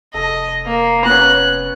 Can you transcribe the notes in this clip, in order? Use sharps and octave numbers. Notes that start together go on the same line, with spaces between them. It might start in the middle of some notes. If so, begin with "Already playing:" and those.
F1 A4 D#5
A#3
B3 C#4 F#6